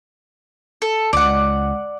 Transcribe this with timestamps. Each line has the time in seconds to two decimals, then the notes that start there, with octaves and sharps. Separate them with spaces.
0.82 A4
1.13 C#2 D5 F#5